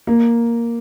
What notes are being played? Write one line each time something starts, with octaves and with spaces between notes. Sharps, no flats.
A#3